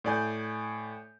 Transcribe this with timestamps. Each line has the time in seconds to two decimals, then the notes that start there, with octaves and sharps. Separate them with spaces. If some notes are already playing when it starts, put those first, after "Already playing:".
0.04 A2 D5 G#5 G6